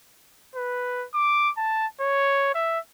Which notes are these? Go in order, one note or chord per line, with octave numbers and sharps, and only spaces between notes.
B4
D6
A5
C#5
E5